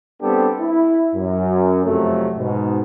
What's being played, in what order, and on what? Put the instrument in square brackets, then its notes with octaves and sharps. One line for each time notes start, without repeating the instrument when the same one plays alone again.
[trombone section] G3 B3 C4 D4 G4 A4
E4
F#2
F2 C3 F#3 A3
G#2 B2